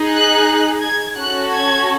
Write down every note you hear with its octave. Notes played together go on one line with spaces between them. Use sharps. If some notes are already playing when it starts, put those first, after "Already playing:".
Already playing: D#4 G#4
F#6
G#6
C#4 F#4 A4 F#6
G#6